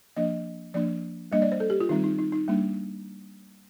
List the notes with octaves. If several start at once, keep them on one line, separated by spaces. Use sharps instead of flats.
F3 A#3 D4 D#5
F3 A#3 D4 D5
G3 A#3 D4 D#5
D5
C5
A4
G4
F4
D#3 G3 C4 D#4
D#4
D#4
D#4
G3 A#3 D4